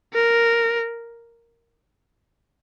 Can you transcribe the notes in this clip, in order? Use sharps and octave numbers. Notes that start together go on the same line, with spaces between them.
A#4